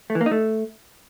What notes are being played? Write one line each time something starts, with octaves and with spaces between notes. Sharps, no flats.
A3
E3
A#3
D#4
A3